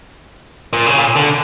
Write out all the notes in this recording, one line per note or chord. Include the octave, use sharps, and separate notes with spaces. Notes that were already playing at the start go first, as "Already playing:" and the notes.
A#2
C#3
A#2
D3